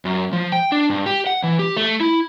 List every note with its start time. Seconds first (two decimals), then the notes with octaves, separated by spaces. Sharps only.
0.05 F#2
0.33 F3
0.52 G5
0.72 D4
0.90 G2
1.06 G4
1.27 F#5
1.43 E3
1.59 G4
1.77 A3
2.00 E4